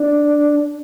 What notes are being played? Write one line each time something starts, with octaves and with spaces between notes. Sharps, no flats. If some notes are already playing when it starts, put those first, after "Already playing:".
Already playing: D4